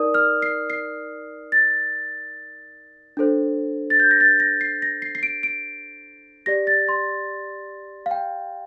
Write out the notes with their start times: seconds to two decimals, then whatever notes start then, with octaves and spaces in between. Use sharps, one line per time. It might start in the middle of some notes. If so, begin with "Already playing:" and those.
Already playing: D#4 A#4 D5 D#6
0.14 F6
0.42 C7
0.70 C7
1.52 A6
3.17 D4 A4 C5
3.90 A6
3.99 G6
4.11 A#6
4.20 A6
4.40 A#6
4.61 C7
4.82 A#6
5.02 C7
5.15 C7
5.23 D7
5.43 D7
6.46 G4 D5 A#6
6.67 A6
6.89 C6
8.06 F5
8.11 G5